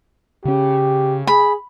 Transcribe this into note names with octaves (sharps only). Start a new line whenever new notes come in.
C#3 C#4 G4
G#4 B5